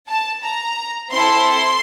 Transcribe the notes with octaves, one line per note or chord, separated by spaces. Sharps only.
A5
A#5
C4 E4 A4 C6